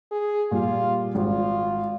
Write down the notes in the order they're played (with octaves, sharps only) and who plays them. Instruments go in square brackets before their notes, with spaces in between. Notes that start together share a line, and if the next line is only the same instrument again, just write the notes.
[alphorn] G#4
[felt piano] A#2 G3 [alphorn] F4
[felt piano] G#1 [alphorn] F4